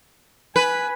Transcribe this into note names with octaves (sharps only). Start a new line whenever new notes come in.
B4 G#5 B5